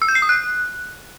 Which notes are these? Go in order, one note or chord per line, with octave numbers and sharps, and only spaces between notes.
E6
G6
C7
D#6
F#6